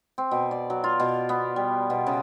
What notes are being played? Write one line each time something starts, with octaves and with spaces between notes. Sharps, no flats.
C4
B2
D5
F#3
F4
B2
B3
G3
B2
C#3